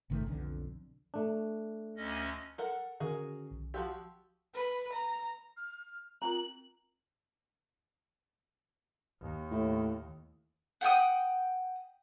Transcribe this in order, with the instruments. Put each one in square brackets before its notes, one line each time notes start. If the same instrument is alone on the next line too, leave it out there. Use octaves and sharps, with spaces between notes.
[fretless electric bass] G1 C3 D#3 A3
B1 F2 D3
[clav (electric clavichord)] A3 D4
[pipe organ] D2 C#4 D#5
[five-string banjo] A4 A#4 F#5
[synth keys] D3 D#3 C#4 [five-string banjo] F#4 G#4 A#4
[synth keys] B1
[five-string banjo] F3 F#4 G4 [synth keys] C6 E6
[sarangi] B4
A#5
[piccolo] F6
[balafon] C4 F4 A#4 [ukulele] A#5 [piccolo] F#7
[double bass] D#2
[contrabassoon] A2
[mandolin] F#5 G5 C#6 D#6